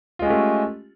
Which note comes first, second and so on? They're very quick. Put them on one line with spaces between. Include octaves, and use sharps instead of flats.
F4 G#3 C#4 G4 A3